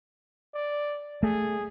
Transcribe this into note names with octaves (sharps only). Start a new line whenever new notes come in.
D5
A3 G#4